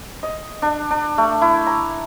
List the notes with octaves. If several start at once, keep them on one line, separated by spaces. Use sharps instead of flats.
D#5
D4
D4
A3
E4
A#5